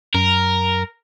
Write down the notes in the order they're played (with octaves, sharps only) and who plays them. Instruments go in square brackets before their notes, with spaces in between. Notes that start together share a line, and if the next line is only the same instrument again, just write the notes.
[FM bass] F#2 [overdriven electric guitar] A#4